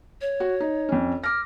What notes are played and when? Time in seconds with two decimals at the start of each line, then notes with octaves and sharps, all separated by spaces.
0.21 C#5
0.40 F#4
0.60 D#4
0.89 F2 C#4
1.24 D6 F6 A#6